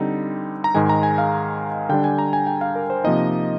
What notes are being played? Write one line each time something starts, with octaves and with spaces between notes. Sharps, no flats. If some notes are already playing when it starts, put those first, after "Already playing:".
Already playing: D3 G3 C4 D#4
A#5
G#2 D#3 G#3 G#5
A#5
G#5
F5
D3 G3 D4 G5
G#5
A#5
G#5
G5
F5
A#4
C5
C3 F3 A#3 D#4 D#5